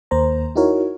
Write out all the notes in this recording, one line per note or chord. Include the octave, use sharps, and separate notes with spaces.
D#2 A#3 C5 A#5
D#4 E4 F#4 A#4 C#5